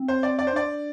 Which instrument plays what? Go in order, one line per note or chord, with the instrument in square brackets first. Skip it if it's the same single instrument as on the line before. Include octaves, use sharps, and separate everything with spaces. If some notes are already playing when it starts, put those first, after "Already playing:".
Already playing: [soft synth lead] C4
[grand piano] C5
D5
D5
C5
[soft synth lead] D4 [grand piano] D5